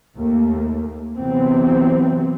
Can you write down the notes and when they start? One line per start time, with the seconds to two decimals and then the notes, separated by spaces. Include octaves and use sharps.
0.15 D#2 A3 A#3
1.16 C3 E3 F#3 B3 C4